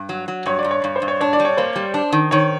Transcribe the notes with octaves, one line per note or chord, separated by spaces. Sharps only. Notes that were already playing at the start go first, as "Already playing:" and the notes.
Already playing: G2
F#3
F#3
G2 C#5
D5
G2
C#5
G2
C5
G2
C#5
D4 C#5
D5
G3
C#5
A#3 C5
G3
D4
D#3
D#3 C#5